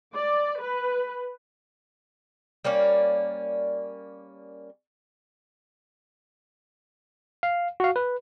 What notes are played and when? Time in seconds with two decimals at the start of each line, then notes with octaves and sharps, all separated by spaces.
0.17 D5
0.60 B4
2.64 G3 A#3 C#4 D5
7.43 F5
7.80 F#4 F5
7.96 B4